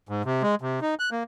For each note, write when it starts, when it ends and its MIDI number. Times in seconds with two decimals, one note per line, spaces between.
0.09 0.22 44
0.25 0.43 48
0.43 0.55 56
0.62 0.80 48
0.82 0.95 63
0.99 1.10 90
1.12 1.23 58